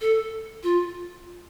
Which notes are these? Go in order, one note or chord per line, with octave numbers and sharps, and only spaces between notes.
A4
F4